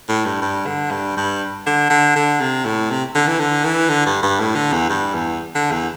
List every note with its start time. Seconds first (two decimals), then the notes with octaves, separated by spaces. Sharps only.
0.09 A2
0.25 G2
0.41 G2
0.66 D3
0.91 G2
1.17 G2
1.66 D3
1.90 D3
2.15 D3
2.41 C3
2.65 A2
2.90 C3
3.15 D3
3.27 E3
3.39 D3
3.64 E3
3.89 D3
4.06 G2
4.23 G2
4.40 A2
4.55 D3
4.72 E2
4.89 G2
5.14 E2
5.55 D3
5.71 E2